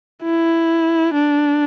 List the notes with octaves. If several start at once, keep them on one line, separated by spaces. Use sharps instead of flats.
E4
D4